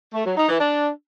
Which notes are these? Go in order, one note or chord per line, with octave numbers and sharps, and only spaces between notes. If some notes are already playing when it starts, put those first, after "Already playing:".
A3
F#3
D#4
E3
D4